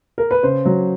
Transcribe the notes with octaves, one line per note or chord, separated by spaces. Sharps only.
A#4
B4
C#3 C5
F#3